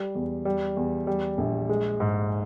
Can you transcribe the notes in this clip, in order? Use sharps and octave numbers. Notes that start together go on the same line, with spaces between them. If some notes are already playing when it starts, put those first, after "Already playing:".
Already playing: G3
E2
G3
E2
G3
A#1
G#3
G#2